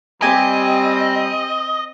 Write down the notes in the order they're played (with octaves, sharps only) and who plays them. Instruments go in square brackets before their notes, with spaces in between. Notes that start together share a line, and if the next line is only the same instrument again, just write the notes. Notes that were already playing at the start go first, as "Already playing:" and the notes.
[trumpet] G3 [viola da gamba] C4 [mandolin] G4 G#5 [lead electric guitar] D#5